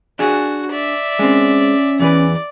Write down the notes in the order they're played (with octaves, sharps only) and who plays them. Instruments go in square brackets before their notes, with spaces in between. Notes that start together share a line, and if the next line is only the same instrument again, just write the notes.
[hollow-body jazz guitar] D4 G#4 [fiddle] F#4
[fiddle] D5 E5
[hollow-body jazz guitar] G#3 C4 [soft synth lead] C#4
[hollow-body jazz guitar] E2 E3 B4 [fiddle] D5